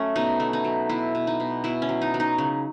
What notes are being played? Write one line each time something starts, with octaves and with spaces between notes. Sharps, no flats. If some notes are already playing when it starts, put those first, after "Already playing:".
Already playing: F#3 A3 C#4
B2 D#4
A3
D#4
F#3
B2 E4
B2
D#4
B2
B2 E4
C#4
F#3
D#4
F#3
D#4
C#3